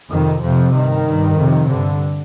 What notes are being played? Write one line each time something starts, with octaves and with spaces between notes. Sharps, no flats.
F2 C3 D#3
F2 C3 F3
G2 D#3
G2
F2 C3
G2 D3